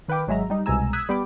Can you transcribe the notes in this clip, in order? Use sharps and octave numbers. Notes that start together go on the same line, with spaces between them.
D#3 B4 F5 G5 D6
G#1 F#3 G#3 E5 A#5
G3 D#4
C2 B2 G#3 G#5 A#5 E6
D#6 E6 F#6 G#6 B6
G3 B3 G5 B5 D6